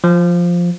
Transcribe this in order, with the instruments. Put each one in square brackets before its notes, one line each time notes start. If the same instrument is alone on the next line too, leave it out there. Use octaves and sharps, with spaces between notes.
[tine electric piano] F3